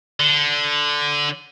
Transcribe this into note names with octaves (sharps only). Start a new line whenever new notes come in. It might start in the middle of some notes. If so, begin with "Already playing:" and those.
D3